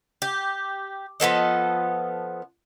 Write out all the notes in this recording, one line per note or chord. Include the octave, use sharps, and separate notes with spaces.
G4
F3 B3 A4 D#5